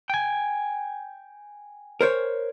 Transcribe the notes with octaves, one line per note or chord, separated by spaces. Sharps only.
G5 G#5
A#4 C5 C#5